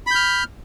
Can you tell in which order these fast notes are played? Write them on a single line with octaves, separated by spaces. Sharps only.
B5 G6 F6